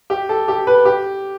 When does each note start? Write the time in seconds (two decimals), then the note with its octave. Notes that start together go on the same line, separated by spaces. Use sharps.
0.10 G4
0.29 A4
0.48 G4
0.67 B4
0.85 G4